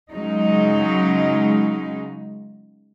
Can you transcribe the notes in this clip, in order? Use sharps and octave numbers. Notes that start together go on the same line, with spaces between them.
C#3 F#3 G#3 D#4